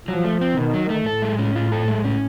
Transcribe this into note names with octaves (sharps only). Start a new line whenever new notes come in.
F3 F#3
A3
C4
B2 D#3
F#3
A3
A2 A4
G#3
C#4
F4
A4
G#3
C#4